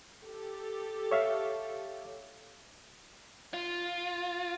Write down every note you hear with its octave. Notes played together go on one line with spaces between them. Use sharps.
G4 A4
C#5 E5 F5
F4